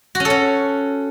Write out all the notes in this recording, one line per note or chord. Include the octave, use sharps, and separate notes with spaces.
F#4
C#4
A4
C#4